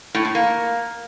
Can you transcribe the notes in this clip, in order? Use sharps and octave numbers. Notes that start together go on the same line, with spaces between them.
A2
A2
A#3